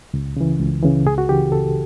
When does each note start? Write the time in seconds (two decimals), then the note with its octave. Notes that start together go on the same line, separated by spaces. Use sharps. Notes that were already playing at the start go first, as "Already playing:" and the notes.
0.14 C#2
0.37 C#3 E3
0.59 C#2
0.83 C#3 E3
1.05 C#2 G#4
1.18 F#4
1.29 C#3 E3 G4
1.52 C#2 A4